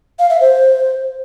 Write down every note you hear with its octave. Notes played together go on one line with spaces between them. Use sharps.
F5
E5
C5